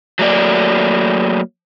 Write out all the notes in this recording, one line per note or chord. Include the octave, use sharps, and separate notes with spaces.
F#3 A3 A#3 D5